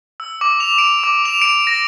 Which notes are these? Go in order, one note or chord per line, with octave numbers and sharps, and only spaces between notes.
E6
D6
F7
D7
D6
F7
D7
A#6